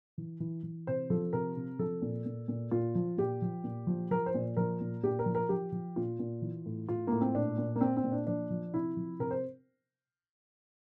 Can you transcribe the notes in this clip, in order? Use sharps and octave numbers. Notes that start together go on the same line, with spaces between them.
E3
E3
E3
C3 C5
F3 A4
C3 A#4
C3
F3 A4
A#2
A#2
A#2
A#2 F4
F3
A#2 G4
F3
A#2
F3
F3 A#4
C5
A#2
F3 A#4
A#2
A#2 G4
A#4
F3
A#4
F3 G4
F3
A#2 F4
A#2
E3
A2
A2 F4
A2 A#3
C4
A#2 D4
A#2
A#3
A#2 C4
C4
A#2
D4
F3 D4
F3
C3 E4
F3
C3 A#4
C5